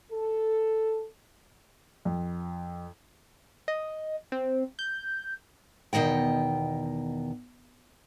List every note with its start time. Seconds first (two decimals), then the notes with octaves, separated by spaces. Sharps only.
0.12 A4
2.05 F2
3.68 D#5
4.32 C4
4.79 G6
5.93 E2 B2 D#3 D#5 G5